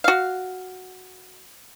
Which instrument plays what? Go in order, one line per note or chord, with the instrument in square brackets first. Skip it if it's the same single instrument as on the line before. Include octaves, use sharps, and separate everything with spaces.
[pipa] F#4 F5